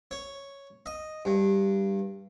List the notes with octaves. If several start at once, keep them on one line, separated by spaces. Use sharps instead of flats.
C#5
D#5
G2